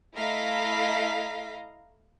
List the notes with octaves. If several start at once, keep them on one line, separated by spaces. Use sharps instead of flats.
A3 E4 D#5 F5 A#5 B6